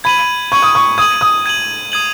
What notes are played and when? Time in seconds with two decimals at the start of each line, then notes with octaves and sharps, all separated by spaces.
0.04 B5 G#6 D#7 F#7
0.52 C#6 G#6 D#7 F#7
0.62 D#6
0.75 C#6
0.98 D#6 G#6 D#7 F#7
1.21 D#6
1.46 G#6 D#7 F#7
1.92 D#6 G#6 D#7 F#7